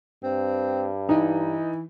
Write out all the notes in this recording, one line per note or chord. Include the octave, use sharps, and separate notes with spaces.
G2 C4
E3 D#4